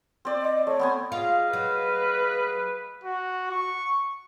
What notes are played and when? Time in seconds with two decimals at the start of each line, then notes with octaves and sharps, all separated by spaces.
0.25 C4 D5
0.42 D#5
0.67 A3 C#5
0.79 B3 C4 G#5
1.12 F4 G#4 D#5 F5
1.53 F#3 B4
3.04 F#4
3.51 C#6